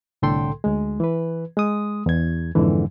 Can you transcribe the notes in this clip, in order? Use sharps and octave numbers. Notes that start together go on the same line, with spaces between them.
C2 A2 D3 A4 G5 C6
D2 G#3
E3 B4
G#3 D#6
E2 G#6
F2 G#2 D3 E3